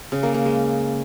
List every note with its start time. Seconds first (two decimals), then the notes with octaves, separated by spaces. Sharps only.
0.12 C#3
0.23 A#3
0.34 A#3
0.45 G#3